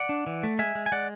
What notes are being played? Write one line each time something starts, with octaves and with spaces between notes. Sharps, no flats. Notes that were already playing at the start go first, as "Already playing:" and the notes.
Already playing: D5 F#5
D4
E3
A3
G#3 E5 G#5
G#3
G#5
G#3 D5 F#5